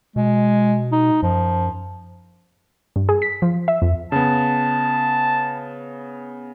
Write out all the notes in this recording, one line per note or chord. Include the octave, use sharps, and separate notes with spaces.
B2 G#3
D#4
F#2 F3
G2
G#4
B6
F3
E5
F2
C#3 B3 A5